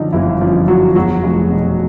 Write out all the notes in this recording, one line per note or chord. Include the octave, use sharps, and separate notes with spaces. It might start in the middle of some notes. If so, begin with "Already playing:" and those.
Already playing: F#2 D3 F3 D4 D#4
G1 E3 E4
F#2 F3 F4
F3 F#3 F#4
E2 F#3 F#4
F1
B2